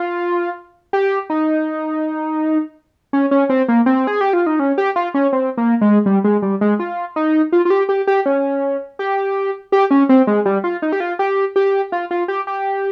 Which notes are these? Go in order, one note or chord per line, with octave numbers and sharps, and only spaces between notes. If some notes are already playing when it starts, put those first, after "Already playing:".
Already playing: F4
G4
D#4
C#4
C#4
C4
A#3
C4
G#4
G4
F4
D#4
C#4
G4
F4
C#4
C4
A#3
G#3
G3
G#3
G3
G#3
F4
D#4
F4
F4
G4
G4
G4
C#4
G4
G4
C#4
C4
G#3
G3
F4
D#4
G4
F4
G4
G4
F4
F4
G4
G4